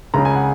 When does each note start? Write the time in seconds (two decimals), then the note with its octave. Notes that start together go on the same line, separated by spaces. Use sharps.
0.14 C#2 C#3 A#5
0.25 G#5
0.35 F#5